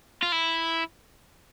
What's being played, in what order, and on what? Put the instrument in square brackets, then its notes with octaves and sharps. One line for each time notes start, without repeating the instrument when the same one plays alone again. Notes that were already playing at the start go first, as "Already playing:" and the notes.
[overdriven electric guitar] F4
E4